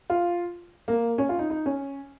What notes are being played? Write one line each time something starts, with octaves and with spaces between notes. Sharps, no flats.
F4
A#3
C#4
F4
D#4
D#4
C#4